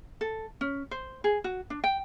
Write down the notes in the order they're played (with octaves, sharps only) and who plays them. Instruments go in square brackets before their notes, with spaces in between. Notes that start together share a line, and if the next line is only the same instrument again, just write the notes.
[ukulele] A4
C#4
C5
G#4
F#4
D4
G5